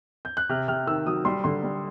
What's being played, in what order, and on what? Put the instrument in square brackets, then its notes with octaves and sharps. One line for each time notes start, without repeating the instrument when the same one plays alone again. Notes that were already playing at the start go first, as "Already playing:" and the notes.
[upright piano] G6
F#6
[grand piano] C3 [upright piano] F6
[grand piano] C3 [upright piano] F6
[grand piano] D#3 [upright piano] E6
[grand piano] F#3 [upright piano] D#6
[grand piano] G3 [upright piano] C6
[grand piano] D3 [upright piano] C6
[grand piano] G3